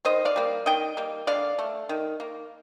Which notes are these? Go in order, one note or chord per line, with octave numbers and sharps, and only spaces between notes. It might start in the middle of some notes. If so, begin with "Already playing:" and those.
D#3 C5 D#5
D5 F5
G3 A#3
D#3 D#5 G5
G3 A#3
D3 D5 F5
A3
D#3
A#3